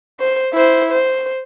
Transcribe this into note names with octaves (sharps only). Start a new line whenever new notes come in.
C5
E4 C5
C5